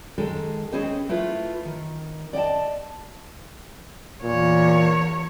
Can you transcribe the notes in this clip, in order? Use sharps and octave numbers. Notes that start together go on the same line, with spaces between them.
D#3 G#3 G#4 A4
C4 C#4 G#4 B4 C5 D#5
A3 E4 F4 B4
D#3
D5 D#5 G5 A5
E2 A#2 C#5